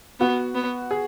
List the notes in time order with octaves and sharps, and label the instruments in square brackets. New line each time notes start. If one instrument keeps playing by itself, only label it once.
[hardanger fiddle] B3 [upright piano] F#4
[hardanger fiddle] B3
[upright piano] G#4